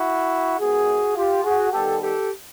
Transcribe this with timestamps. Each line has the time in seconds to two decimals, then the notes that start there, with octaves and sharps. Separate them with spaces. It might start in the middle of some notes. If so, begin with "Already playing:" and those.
Already playing: E4 F#4
0.59 D#3 G#3 B3 F#4 G#4
1.16 F4 G4
1.44 F#4 G#4
1.72 D#3 G3 B3 G4 A4
2.01 G4 A4